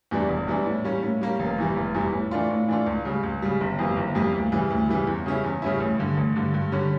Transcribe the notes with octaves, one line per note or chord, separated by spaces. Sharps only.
E2 E3 G3 D4
E1
E2 E3 G3 D4
A2
G3 A#3 C#4
A2
G3 A#3 C#4
F1
E2 E3 G3
F1
E2 E3 G3
A2
E3 A3 D4 F4
A2
E3 A3 D4 F4
C#2
C#3 G3
C#2
C#3 G3
G1
F2 E3 G3 A#3
G1
F2 E3 G3 A#3
D2
C#3 E3 G3
D2
C#3 E3 G3
E2
C#3 G3 C#4 E4
E2
C#3 G3 C#4 E4
A1
G2 D3
A1
G2 D3
G2
D3 G3 C#4